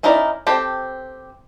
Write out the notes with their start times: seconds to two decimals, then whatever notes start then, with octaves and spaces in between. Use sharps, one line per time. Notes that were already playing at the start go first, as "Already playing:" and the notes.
0.03 C#4 D#4 E4 A#4 D5
0.47 C4 G4 A4 G5